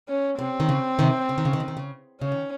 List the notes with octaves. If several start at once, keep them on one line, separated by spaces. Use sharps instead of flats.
C#4
C3 C4
D#3
C#3
C3 D#3
C#3
D#3
C#3
D#3
C#3
D#3
C#3
C#3 C#4
D#3